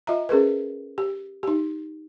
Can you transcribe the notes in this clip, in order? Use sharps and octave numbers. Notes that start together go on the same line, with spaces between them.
F4 D#5 E5 A#5
C#4 G#4 A#4 B4
G4
D#4 G4